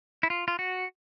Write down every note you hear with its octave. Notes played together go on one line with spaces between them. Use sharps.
E4
F4
F4
F#4